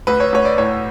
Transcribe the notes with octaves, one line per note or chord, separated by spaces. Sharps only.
D2 B4
C#5
D2 C#5
D5
A2 C#5